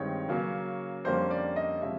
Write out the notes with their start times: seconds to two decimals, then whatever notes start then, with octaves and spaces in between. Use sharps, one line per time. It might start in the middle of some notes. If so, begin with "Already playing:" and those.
Already playing: G2 D#3 G#3 C4 C#5
0.29 C#3 F#3 A#3 C#4
1.05 F2 D3 G3 A#3 C#4 C5
1.31 D5
1.56 D#5
1.82 C3 F3 G#3 C#4 E5